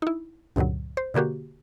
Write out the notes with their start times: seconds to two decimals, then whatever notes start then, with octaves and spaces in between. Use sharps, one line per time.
0.02 D#4 E4
0.56 C#2 G2 A#2 D3 F#3
0.97 C5
1.14 B2 D3 A#3 F#4 G4